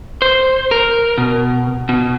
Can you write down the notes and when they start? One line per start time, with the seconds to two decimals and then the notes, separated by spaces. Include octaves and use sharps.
0.22 C5
0.71 A#4
1.18 B2
1.89 B2